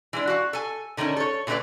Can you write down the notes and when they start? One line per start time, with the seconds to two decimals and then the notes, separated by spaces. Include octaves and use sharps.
0.13 E3 G#3 D4
0.28 F#4 F5
0.53 A4 G#5
0.97 D3 D#3 A3 C4 C#4
1.17 A4 C#5
1.47 A#2 D3 A3 D4 B4 D5